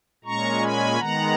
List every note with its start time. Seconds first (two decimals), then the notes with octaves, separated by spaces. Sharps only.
0.24 A#2 G#3 C#4 A#5 C#6
0.61 G#5 B5
0.99 D#3 G#3 B3 F#5 A#5